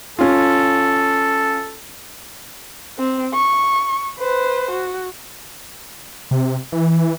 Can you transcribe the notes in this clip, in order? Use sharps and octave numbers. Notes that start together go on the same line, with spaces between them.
C#4 F4 A4
C4
C#6
B4 C5
F#4
C3
E3